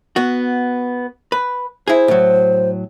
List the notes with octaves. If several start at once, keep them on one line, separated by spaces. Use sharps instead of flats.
B3 F#4
B4
E4 G#4 C5
A2 F#3